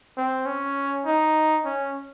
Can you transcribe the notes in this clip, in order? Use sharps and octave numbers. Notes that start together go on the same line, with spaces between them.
C4
C#4
D#4
C#4